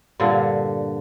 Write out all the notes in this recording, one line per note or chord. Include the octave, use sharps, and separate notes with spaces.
G2 A#2 D3